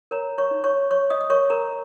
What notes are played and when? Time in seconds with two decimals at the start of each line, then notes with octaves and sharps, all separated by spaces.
0.11 A#4 C#5 A#5
0.38 C#5 C#6
0.51 D#4
0.64 C#5 C#6
0.91 C#5 C#6
1.10 D#5 D#6
1.21 D#6
1.30 A#4 C#5 C#6
1.50 A#4 A#5